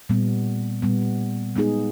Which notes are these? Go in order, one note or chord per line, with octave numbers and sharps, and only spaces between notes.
A#2 G3 B3
A#2 G3 B3
G#3 B3 D#4 G#4